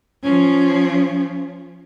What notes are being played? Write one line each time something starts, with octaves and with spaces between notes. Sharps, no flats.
F3 C#4